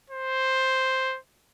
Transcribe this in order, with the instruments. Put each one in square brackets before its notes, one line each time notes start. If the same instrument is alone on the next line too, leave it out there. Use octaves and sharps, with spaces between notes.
[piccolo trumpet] C5